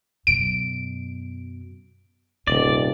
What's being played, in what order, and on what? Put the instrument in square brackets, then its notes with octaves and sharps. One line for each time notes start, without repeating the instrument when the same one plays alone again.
[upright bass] F#2 B2 [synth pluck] D7
[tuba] D#1 [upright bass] G#2 C3 [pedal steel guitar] D5